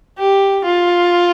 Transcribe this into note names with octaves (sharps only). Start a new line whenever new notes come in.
G4
F4